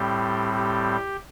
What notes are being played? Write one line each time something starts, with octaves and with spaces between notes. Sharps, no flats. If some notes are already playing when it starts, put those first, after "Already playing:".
Already playing: A2 G3 C4 G4
G4